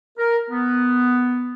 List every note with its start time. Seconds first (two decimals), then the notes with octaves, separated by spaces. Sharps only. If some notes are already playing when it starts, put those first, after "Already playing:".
0.18 A#4
0.50 B3